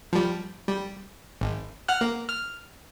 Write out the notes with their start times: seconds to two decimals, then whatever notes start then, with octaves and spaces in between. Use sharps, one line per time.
0.13 F3 G3
0.67 G3
1.41 G#1
1.88 F#5 F6 F#6
2.01 A#3
2.29 F6